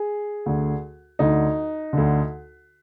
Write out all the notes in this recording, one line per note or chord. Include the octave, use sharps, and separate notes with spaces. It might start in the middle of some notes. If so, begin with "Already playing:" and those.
Already playing: G#4
D2 D3
D2 D3 D#4
D2 D3